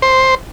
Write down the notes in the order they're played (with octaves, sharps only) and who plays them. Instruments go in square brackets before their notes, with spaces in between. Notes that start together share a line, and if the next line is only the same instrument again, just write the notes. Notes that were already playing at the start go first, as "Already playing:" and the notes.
[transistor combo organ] C5